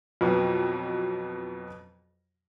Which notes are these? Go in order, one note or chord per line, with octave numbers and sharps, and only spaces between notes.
F2 B2 F#3